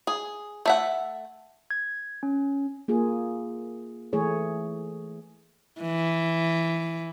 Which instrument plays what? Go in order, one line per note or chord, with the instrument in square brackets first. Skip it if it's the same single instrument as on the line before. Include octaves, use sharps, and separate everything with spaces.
[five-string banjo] G#4
A3 E5 F#5
[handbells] G#6
C#4
[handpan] A#3 F4 G#4
E3 A3 G#4 C#5
[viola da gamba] E3